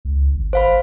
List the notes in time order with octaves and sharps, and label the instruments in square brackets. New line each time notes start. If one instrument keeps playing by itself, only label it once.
[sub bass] C#2
G#1
[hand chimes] C5 F5 B5